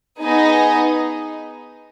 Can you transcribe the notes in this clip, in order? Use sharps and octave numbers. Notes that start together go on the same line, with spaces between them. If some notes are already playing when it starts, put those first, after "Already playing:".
B3 D#4 G#4 D#5